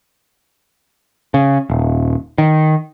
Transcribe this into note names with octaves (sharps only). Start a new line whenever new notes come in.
C#3
D#1
D#3